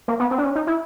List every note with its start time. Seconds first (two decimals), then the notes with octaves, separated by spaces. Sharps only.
0.08 A#3
0.20 B3
0.31 C4
0.38 D4
0.43 C#4
0.56 D#4
0.67 E4